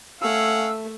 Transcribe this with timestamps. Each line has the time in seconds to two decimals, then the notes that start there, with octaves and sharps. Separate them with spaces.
0.21 A3 C#4 F5 F#5 E6